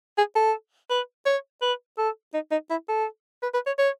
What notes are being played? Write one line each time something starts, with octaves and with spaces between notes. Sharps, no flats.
G#4
A4
B4
C#5
B4
A4
D#4
D#4
E4
A4
B4
B4
C#5
C#5